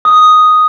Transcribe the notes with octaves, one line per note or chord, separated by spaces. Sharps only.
D#6